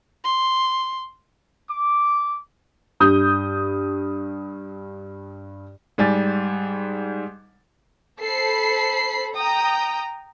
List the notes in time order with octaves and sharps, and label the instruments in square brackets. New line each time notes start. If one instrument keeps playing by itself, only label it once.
[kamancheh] C6
[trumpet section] D6
[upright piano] G2 D#6 G6
G#2 G3 G#5 A6
[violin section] A4 C5 B5 C7
G5 A#5 D#6